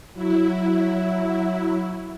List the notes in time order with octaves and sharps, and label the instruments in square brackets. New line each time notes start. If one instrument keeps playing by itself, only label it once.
[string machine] F#3 E4